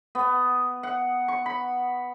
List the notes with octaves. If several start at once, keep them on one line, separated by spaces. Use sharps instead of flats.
B3
F#5
C#6
B5